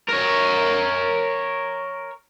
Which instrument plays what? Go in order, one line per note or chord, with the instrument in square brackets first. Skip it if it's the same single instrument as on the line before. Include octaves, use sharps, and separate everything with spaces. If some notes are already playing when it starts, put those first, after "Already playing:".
[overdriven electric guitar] A#4 C#5